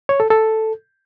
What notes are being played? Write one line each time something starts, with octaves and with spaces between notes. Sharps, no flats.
C#5
A4
A4